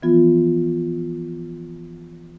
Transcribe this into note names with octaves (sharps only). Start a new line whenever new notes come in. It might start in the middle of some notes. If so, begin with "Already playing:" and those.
E3 F3 B3 F4